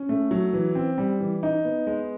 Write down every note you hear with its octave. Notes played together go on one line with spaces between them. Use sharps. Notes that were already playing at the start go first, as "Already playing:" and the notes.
Already playing: C#4
A3
F#3
E3
C4
G3
E3
D#4
B3
G#3